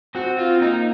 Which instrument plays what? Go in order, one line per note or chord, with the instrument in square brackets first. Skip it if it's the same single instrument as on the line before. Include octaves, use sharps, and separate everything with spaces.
[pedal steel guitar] C4 [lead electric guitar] F#4
[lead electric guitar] F4
[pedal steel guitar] A#3 [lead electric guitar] D#4